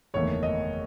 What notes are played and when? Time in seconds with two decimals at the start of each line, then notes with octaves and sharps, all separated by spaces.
0.14 F#1 E2 D#3 A3 C#5
0.43 D#5